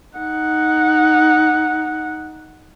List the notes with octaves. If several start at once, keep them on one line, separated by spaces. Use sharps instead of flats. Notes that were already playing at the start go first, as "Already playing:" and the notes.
D#4 F#5